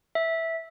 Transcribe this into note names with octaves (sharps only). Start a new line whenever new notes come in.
E5